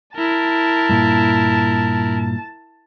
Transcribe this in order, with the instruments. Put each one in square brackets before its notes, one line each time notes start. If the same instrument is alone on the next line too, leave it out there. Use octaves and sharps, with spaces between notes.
[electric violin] E4 A#4 [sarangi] A5
[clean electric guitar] G2 A#2